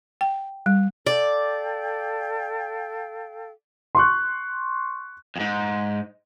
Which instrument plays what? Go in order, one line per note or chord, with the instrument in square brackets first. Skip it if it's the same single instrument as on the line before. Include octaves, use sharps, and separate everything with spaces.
[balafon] G5
G3
[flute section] A4 F5 G5 [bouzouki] D5
[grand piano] C6 C#6 F#6
[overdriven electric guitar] F2 G#2